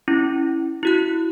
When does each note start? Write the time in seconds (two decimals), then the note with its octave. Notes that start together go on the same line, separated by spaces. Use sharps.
0.08 C#4 E4
0.83 E4 F#4 F#6